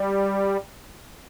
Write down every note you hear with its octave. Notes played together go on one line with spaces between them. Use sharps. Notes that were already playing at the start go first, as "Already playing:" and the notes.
Already playing: G3